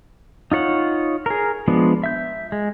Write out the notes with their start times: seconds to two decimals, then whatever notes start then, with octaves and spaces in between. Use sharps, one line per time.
0.52 D#4 F4 C#5 F#5
1.26 G#4 A#4
1.68 F3 G#3 B3 D4
2.04 E5 G6
2.52 G#3